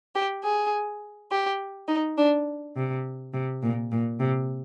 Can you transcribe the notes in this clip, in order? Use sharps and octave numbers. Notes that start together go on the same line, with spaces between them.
G4
G#4
G4
D#4
D4
C3
C3
A#2
A#2
C3